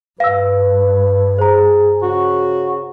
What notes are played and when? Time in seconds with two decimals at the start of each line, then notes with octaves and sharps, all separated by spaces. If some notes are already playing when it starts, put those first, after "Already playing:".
0.20 G2 B4 F5 E6
1.39 G#4 C5 A#5
2.02 C#3 F#4